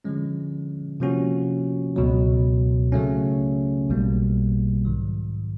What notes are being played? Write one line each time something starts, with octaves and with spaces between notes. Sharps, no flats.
D3 F3 G#3 C#4
C3 F3 A#3 C#4 F#4
C#2 B2 F#3
C#3 F#3 A3 C#4
B1 B2 G3 A#3
G#2 D#3 F#3